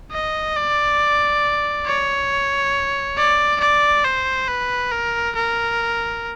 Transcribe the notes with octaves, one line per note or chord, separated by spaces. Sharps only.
D#5
D5
C#5
D5
D5
C5
B4
A#4
A#4